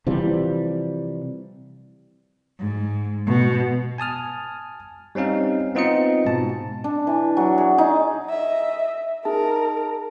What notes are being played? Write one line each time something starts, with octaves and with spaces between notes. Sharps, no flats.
C3 E3 F3 G3
G#2
B2
G#5 A5 D#6 F6
G3 C4 C#4 D#4 F5
B3 C4 D#4 F4 D#5 C#7
G#2 B2 A5
D4
E3
F#3
G#4
D#4
D#5 E5
D#4 G#4 A#4 A5